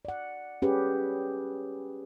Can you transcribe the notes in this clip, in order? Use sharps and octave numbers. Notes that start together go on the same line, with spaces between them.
D5 F#5
C#4 G4 G#4 B4